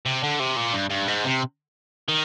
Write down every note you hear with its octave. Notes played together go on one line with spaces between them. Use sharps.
C3
D3
C3
A#2
G2
G2
G#2
C3
D#3